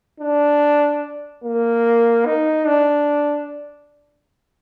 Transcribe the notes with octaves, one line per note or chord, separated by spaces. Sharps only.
D4
A#3
D#4
D4